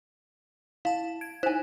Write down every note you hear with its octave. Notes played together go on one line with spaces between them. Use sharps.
E4 F5 A5
G#6 D7
D#4 E4 C5 G#5